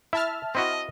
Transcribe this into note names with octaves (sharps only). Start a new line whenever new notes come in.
E4 E5 A5 F6
C4 E4 F#4 D#5